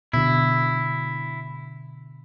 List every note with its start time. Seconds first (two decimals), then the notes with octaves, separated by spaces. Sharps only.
0.13 B2 D3 E4